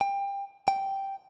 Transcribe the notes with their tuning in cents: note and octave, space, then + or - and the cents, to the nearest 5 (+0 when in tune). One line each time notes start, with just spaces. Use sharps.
G5 +25
G5 -5